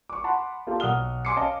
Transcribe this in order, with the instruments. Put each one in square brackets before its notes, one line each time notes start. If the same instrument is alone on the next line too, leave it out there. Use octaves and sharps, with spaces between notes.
[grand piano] C#6 D6
F#5 A5 B5 C6
A#3 F4 G4 A4
B1 F#5 D#6 F6 G7
G#5 C6 D6 C7 C#7
C#4 D#5 F5 A5